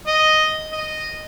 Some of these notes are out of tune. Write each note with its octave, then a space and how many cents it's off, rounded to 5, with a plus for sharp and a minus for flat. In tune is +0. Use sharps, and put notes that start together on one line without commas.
D#5 +0
D#5 -10